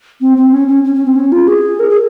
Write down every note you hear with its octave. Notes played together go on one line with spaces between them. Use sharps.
C4
C4
C#4
C#4
C#4
C#4
C4
C#4
F4
G#4
A#4
G#4